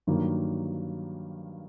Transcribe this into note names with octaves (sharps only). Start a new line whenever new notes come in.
G2 D#3 F#3 A#3